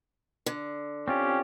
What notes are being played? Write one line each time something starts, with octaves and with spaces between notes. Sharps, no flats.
D3
C4 C#4 F4 G4